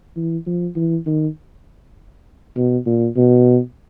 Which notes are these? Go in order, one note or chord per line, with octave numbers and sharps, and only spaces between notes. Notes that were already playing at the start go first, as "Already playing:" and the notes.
E3
F3
E3
D#3
B2
A#2
B2